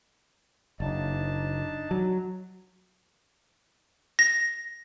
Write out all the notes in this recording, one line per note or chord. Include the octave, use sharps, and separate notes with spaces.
F#1 D4 D#4 A5
F#3
A#6